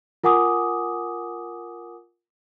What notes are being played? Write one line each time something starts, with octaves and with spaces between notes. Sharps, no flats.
F4 A#4 F#5 G#5 D6 D#6